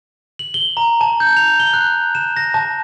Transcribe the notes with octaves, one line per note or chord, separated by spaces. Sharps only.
F#7
G7
A#5
A5
G6
F7
G7
F#6
E7
A#6
A5